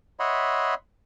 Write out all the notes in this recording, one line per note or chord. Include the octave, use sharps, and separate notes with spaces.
C#5 D#5 E5 F#5 B5 C6